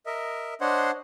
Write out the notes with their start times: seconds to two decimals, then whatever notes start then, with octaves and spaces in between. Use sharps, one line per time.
0.06 A#4 D#5 E5
0.61 D4 C5 C#5 D#5 F#5 C6